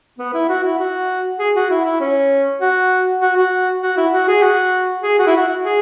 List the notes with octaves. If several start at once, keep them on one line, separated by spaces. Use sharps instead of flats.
B3
E4
F#4
E4
F#4
G#4
F#4
E4
E4
C#4
F#4
F#4
F#4
F#4
E4
F#4
G#4
F#4
G#4
F#4
E4
F#4
G#4